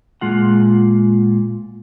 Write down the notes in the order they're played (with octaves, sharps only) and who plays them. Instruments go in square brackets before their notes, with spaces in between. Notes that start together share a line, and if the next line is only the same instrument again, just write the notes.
[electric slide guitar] A#2 G#3 F4 F#5